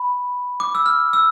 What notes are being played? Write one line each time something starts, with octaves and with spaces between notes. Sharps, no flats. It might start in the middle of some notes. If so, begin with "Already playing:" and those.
Already playing: B5
D6
E6
F6
E6